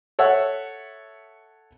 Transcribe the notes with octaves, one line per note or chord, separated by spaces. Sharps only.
A4 C#5 E5 F#5 E6